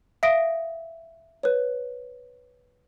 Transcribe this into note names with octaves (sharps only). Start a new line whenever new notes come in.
E5 F5 D#6 A#6 D7
B4 C#5